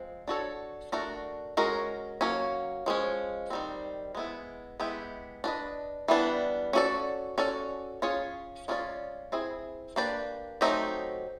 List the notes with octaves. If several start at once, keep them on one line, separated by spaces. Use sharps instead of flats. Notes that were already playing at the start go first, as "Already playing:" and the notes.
Already playing: F3 G#3 C4
D4 F#4 A4 C#5
A3 D4 F#4 A#4
G#3 C#4 F#4 A#4
F#3 A#3 C#4
F3 G#3 C#4
D#3 G3 C4
G#3 B3 E4
G#3 B3 E4 G4
D4 F#4 B4 D#5
E3 G3 B3 D4
C#4 F#4 A4 D5
C#4 F#4 A4 D5
C#4 F4 G#4 C#5
G#3 C#4 F4 A#4 D5
C4 E4 G#4
A#3 D4 G4 B4 D5
F#3 A3 C4 D#4 G4